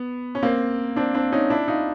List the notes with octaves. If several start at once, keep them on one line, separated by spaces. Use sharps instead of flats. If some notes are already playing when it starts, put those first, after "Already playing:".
Already playing: B3
C#4
A#3 C4
C4 D4
C4 D4
C#4 D#4
D4 E4
D#4 F4